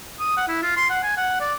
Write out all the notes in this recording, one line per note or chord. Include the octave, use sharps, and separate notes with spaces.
D#6
F#5
E4
F4
C6
F#5
G#5
F#5
D5